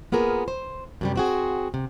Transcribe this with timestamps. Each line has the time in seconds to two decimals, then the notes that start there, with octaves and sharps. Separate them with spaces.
0.12 A#3 B3 F4 G#4 A#4
0.48 C5
1.01 F#2 C3 G3
1.16 C4 F#4 G#4
1.74 C3